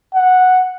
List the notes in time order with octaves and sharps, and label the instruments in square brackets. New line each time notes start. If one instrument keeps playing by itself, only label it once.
[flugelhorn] F#5